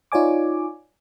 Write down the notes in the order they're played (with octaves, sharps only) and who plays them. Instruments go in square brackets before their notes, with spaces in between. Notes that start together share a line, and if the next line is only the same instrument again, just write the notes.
[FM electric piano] D#4 F4 C#5 D5 G#5 D6